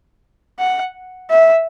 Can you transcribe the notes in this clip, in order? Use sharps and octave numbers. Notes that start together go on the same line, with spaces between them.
F#5
E5